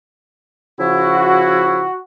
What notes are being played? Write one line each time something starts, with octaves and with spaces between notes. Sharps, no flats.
C#3 F3 E4 F#4